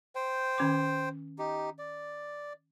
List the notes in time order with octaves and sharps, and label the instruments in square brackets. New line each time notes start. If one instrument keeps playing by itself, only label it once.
[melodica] C5 G5
[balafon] D#3 C#4 D6
[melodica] D#4 G4
D5